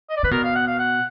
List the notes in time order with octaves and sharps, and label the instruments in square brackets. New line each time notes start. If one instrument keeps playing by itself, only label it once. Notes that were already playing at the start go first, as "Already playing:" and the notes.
[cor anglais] D#5
D5
[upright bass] D3 [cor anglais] B4
[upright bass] B2 [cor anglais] A#4
[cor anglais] F5
F#5
F5
F#5